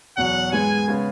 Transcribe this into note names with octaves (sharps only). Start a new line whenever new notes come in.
E2 B2 F#3 F#5
G#2 G#3 B3 G#5
C#3 G#3 B3